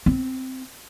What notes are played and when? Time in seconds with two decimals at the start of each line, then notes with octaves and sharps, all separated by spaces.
0.06 C4